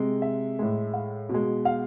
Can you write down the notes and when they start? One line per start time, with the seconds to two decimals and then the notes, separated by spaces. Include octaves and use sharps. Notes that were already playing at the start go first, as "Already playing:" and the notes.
Already playing: C3 G#3
0.22 E5
0.59 A2 G#3
0.93 F5
1.29 B2
1.34 G#3
1.65 F5